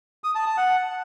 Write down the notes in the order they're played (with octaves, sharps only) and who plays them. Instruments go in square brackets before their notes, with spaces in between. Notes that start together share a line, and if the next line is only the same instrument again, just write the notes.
[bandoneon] D#6
A5
A5
F#5